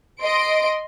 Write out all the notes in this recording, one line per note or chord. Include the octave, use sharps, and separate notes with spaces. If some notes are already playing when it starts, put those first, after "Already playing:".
D#5 C6 D7